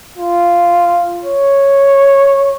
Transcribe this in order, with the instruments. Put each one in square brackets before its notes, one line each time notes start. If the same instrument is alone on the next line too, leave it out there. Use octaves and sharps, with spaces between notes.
[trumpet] F4
C#5